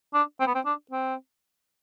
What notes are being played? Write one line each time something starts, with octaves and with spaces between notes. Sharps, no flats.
D4
C4
B3
C4
D4
C4